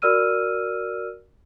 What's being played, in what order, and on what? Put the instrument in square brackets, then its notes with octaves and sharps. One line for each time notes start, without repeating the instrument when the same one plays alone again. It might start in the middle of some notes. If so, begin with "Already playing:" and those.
[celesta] F#4 A#4 D5 E6 F6 D#7